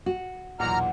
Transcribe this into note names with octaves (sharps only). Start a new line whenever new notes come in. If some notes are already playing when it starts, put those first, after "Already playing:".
F#4
B1 E2 A#2 F#5 A#5 F6